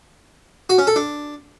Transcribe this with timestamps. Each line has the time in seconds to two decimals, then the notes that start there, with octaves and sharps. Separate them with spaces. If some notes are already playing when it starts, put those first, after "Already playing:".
0.70 F#4
0.78 C#4
0.87 A4
0.96 D4